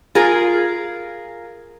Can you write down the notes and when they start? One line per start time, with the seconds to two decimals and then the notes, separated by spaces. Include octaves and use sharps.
0.15 F4 G#4 A#4